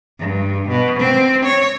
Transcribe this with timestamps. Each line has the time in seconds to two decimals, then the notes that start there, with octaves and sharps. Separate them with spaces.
0.19 G2
0.69 B2
0.99 C4
1.45 C#5